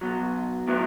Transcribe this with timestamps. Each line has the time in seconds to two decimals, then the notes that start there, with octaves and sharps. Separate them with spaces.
0.01 B1 B2 F#3
0.68 A2 F#3 B3